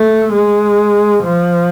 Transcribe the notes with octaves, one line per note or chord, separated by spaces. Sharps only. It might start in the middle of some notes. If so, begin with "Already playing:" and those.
Already playing: A3
G#3
F3